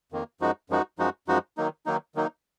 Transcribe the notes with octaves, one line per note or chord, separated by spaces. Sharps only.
F2 D#3 A#3
F#2 F3 G#3 D#4 F#4
F#2 F3 G#3 D#4 F#4
F#2 F3 G#3 D#4 F#4
F#2 F3 G#3 D#4 F#4
D#3 F#3 A#3 D#4
D#3 F#3 A#3 D#4
D#3 F#3 A#3 D#4